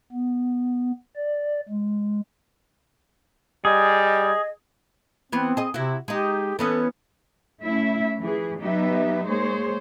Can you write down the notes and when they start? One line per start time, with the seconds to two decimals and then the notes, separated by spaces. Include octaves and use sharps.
0.12 B3
1.16 D5
1.69 G#3
3.65 G3 G#4 D#5
5.32 E3 B3 C4
5.57 G#4 D#5
5.74 C3 E4 F#4
6.08 G#3 D#4 G4
6.59 E3 B3 C#4 A4
7.62 A3 C#4 E4 E5
8.22 E3 F3 G#4
8.61 F#3 B3 D#4 G4 B4 E5
9.27 G#3 A#3 G#4 C5 C#5